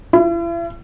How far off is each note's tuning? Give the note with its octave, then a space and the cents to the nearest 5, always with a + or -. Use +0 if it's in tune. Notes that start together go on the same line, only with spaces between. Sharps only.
E4 +40